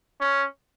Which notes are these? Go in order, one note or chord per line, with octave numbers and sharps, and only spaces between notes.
C#4